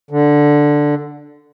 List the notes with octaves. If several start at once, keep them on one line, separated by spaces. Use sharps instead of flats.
D3